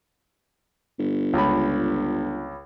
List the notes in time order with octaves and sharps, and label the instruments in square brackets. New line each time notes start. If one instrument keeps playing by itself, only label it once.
[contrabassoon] G1
[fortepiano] C#2 B5